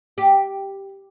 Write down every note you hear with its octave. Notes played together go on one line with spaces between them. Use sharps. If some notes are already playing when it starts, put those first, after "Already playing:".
G4